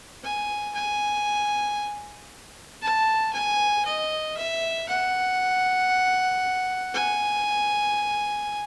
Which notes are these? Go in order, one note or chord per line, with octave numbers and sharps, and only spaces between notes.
G#5
G#5
A5
G#5
D#5
E5
F#5
G#5